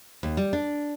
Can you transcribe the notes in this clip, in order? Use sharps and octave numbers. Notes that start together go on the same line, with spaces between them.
D#2
G3
D4